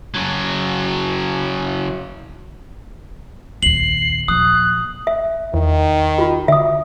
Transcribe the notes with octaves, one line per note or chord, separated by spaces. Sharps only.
C#3 F#3
A#1 D#2 C7 F#7
A#2 F3 D#6 F#6
E5
E2 D#3
F4 F#4
D3 E5 D#6